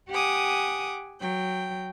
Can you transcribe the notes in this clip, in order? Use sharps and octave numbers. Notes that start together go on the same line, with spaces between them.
G4 F#5 G#5 D6 D#6
F#3 G5